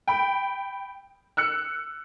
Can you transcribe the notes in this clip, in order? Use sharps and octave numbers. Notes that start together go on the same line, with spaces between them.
G5 B5
E6 F#6 C#7